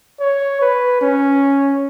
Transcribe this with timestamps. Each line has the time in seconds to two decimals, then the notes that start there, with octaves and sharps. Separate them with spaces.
0.20 C#5
0.61 B4
1.01 C#4